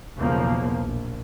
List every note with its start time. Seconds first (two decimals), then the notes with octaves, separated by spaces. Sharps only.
0.19 B1 E2 C#3 F3 A#3
0.82 A#1